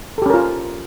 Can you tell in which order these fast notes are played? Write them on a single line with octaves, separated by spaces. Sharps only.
A4 G4 C#4 A#4 F4